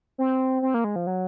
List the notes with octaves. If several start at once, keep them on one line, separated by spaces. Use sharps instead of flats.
C4
C4
A#3
G#3
F3
F#3